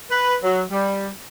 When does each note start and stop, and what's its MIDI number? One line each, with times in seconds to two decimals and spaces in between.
0.10 0.35 71
0.43 0.62 54
0.71 1.07 55